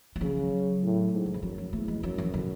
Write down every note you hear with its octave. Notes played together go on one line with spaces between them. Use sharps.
G#3
C#3 F#3
A2
G#2
D3
E3
F#2 F#3
F#3
E2 A3
G#3
F#2 F#3
E3
D3